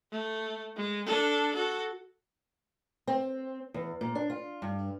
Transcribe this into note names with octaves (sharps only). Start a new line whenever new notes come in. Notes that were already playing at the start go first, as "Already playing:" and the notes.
A3
G#3
D4 A4
F#4 A4
C4
E2
A#2
D4
F4
G2